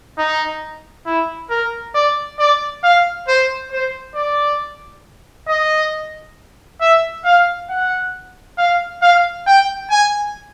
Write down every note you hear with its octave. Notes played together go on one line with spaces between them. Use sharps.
D#4
E4
A#4
D5
D5
F5
C5
C5
D5
D#5
E5
F5
F#5
F5
F5
G5
G#5